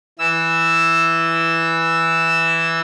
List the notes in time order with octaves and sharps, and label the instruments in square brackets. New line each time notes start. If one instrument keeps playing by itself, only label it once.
[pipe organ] E3 E6